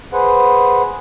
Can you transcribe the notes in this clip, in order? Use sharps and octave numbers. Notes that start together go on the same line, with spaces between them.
G#4 B4 C5 F#5